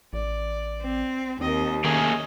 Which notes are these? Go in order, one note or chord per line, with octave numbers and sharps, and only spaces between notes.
A1 D5
C4
D#2 C4 A#4 D#5
D#3 A3 A#3 C#4 G#4 D#5